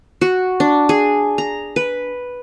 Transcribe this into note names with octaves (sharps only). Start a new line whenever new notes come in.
F#4
D4
G#4
A#5
B4